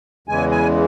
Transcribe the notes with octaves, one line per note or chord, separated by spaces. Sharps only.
E2 C#3 E3 G#3 G#5
G#5